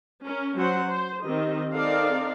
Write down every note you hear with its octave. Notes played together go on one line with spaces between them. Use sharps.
C#4 A#4
F#3 C#4 C5 F#5
C5
D#3 C4 G4 D#5
C4 D#4 A4 A#4 D5 F5